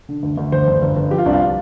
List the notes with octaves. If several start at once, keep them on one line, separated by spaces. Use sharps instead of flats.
D3
D2
D2
G1 C5
G1
G1
G1
F3 G4
F4
C2 D4
F4